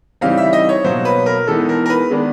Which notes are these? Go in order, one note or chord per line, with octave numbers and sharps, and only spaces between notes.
C#3 E3 G3 C4 D#4 F5
E5
D#5
C#5
B2 F#3 A#3 C5
B4
A#4
E3 G#3 B3 D#4 A4
A#4
A#4
B4
D#3 G#3 B3 D4